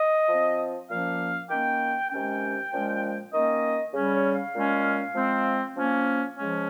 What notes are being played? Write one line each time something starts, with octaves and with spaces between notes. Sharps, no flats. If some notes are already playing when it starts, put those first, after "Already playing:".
Already playing: D#5
F3 C4
A#2 F3 A#3 C#4 F5
D#3 A#3 C#4 G5
C3 D#3 G#3 C#4 G5
A#2 F3 G#3 C#4
D#3 A#3 C#4 D#5
C#3 G3 C#4
C#5
F5
A#2 G#3 C#4
F3 G#3 C4
F3 A#3 C#4
C#3 F3 G#3 C#4